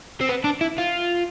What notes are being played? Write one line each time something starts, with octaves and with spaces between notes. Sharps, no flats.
C4
B3
D4
E4
F4